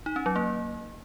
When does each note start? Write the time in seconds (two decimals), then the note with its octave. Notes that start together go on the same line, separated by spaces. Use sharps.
0.06 D#4
0.16 C#4
0.26 F#3
0.36 A#3